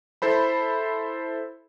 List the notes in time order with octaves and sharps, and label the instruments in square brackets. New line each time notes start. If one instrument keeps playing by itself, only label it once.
[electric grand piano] E4 A4 C5 B5